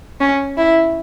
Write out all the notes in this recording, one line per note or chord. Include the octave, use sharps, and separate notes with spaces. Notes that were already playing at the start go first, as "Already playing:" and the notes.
C#4
E4